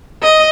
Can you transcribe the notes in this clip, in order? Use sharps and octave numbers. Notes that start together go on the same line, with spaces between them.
D#5